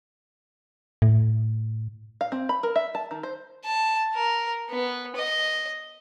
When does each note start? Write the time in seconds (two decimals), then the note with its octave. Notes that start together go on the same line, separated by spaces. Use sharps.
1.02 A2
2.21 F5
2.32 C4
2.49 B5
2.63 A#4
2.76 E5
2.95 A5
3.11 D#3
3.23 C5
3.64 A5
4.15 A#4
4.70 B3
5.16 D#5